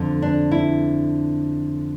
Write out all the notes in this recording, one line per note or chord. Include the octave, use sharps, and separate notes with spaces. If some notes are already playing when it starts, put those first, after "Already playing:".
Already playing: F2 D3
D4
E4